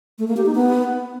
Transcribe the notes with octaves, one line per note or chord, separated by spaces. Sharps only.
A3
A#3
G4
D#4
B3